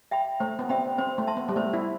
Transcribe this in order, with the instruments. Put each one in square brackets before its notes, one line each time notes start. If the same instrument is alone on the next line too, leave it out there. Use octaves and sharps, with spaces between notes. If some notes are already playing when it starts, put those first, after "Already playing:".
[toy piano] E5 G5 B5
[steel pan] A3 [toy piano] C5
[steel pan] B3
[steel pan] C4 [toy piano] E5 G5 B5
[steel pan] C4 [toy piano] C5
[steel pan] A3
[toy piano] E5 A5 C6
[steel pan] B3
G3
[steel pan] A3 [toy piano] C5
[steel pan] E4